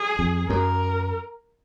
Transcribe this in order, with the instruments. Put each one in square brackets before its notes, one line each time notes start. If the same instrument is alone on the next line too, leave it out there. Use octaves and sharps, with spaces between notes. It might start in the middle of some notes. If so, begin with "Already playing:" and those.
Already playing: [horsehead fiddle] G#4
[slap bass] F2
[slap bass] F#2 [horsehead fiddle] A#4